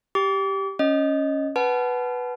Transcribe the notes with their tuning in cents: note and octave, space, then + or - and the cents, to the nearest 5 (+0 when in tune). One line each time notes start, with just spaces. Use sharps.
G4 +0 D6 -35
C#4 +0 D#5 +0
B4 +0 F#5 +15 A5 -30